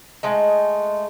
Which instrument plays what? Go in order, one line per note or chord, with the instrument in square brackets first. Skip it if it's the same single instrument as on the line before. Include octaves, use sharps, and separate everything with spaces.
[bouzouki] G#3 A3 D#4